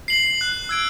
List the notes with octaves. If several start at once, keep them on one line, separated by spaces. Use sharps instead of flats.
C7 F#7
F#6
E6 G#6 D7